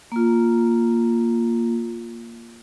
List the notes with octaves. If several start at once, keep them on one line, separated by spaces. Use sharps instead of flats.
A#3 F4